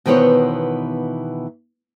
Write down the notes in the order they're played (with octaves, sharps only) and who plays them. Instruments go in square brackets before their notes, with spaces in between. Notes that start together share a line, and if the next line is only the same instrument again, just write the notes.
[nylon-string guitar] B2 D#3 E3 B3 C5 C#5